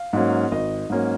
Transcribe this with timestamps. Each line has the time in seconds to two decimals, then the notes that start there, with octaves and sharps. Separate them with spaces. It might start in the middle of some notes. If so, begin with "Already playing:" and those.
Already playing: F5
0.13 G#2 F#3 A#3 C#4
0.52 G#1 D#5
0.90 G#2 F#3 A#3 C#4